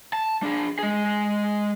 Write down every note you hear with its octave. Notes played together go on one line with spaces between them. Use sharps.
A5
D4 G#4
G#3 G#4